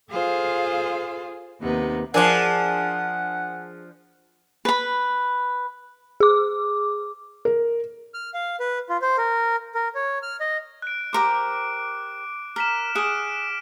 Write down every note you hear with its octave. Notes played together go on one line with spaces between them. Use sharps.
F4 G#4 A4 C5 F5
D#2 C3 B3 D#4
F3 D4 G#4 A#4 D5 F#5 A5 D6
B4 B5
G#4 D6
A#4
F6
F5
B4
F4
C5
A#4
A#4
C#5
F6
D#5
F#6 D7
G4 A#4 C5 D6 D7
A#4 F6 B6 E7
G#4 F#5 D7 E7